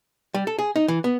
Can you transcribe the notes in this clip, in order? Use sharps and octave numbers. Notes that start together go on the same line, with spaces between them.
G3
A4
G#4
D#4
E3
B3